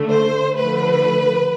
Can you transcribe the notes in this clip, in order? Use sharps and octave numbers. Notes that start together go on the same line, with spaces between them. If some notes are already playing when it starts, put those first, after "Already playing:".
Already playing: D3 A3
C5
D3 F3 A3 B4